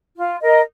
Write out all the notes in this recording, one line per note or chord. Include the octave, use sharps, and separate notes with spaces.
F4
A#4 D#5